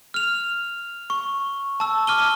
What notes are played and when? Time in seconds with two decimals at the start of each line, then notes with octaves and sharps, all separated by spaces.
0.14 F6 F7
1.10 C#6
1.80 A5 E6
2.07 D6 F6 D#7 G7